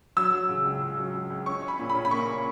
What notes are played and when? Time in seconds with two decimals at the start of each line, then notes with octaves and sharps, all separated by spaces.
0.17 F#3 E6
0.32 F#3
0.49 C#3
0.65 C#2
0.82 C#3
0.97 F#3
1.13 C#2
1.30 C#2
1.46 C#4 C#6
1.62 C#4
1.68 B5
1.79 A#2
1.90 B5
1.95 C#4
2.05 B5
2.11 A#3 C#6
2.28 C#4